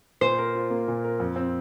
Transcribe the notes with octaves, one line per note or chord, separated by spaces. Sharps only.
A#2 C5
A#4
F4
A#3
A#2
A#4
F2
C4